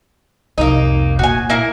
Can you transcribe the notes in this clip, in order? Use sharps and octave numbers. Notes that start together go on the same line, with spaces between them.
C2 F2 A#3 D#4
A#2 F#4 G#5
A#3 E4 A#4